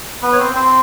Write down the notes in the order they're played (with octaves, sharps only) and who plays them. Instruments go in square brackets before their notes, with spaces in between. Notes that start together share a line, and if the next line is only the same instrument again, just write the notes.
[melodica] B3 B4
C#5
C4 C5
C4 C5